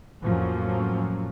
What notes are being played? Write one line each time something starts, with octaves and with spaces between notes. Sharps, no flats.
F2 A2 F3 F#3 A#3 C#4